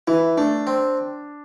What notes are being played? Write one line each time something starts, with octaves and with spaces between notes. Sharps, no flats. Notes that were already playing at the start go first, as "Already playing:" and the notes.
E3 E4
A3 D4
C4